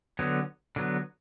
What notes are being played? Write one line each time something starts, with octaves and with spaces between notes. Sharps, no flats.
D3 F#3 B3
D3 F#3 B3